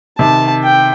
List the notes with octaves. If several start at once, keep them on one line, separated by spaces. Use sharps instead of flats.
C3 D#3 A5
G5